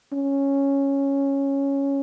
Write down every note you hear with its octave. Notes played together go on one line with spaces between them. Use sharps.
C#4